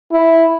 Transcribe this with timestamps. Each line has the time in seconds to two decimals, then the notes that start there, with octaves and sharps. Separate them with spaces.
0.12 E4